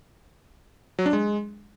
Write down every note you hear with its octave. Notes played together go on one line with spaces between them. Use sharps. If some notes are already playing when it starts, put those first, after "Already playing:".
F#3
D4
G#3